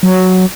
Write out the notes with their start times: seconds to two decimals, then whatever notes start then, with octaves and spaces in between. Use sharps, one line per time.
0.03 F#3